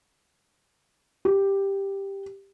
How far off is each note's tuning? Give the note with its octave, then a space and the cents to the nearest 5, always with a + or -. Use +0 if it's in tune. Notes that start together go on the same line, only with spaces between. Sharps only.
G4 +5